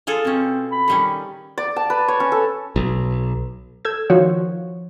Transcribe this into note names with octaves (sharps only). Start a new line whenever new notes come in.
F4 G#4 A4
B2 C4 C#4
B5
D#3 G3 C#4
D5
A5
B4
C#5
C#4
A4
B1
A4 E6 G6 G#6
D#3 F3 F#4 C#5